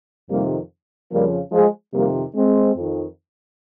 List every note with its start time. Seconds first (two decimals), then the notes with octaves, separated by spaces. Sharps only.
0.29 F2 C3 D#3 G3 A#3
1.11 F2 C#3 F3 G3 A#3
1.52 F3 G#3
1.93 F2 C3 D#3 G3 A#3
2.34 G#3 C4
2.76 F2 D#3